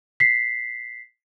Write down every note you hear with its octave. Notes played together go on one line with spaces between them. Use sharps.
B6 C7